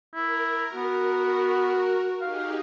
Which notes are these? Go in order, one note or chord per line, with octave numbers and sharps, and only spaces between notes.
E4 A#4
B3 F#4
D#4 G4 G#4 F5